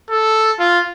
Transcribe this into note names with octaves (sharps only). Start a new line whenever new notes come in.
A4
F4